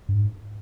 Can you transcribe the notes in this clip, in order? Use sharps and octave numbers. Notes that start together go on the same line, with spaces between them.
G2
G#2